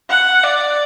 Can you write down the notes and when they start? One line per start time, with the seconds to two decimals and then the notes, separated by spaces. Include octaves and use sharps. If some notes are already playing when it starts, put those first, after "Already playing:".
0.10 F#5
0.44 D5